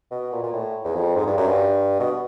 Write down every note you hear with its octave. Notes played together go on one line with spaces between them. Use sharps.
B2
A#2
A#2
A2
E2
F2
G#2
G2
F#2
G2
B2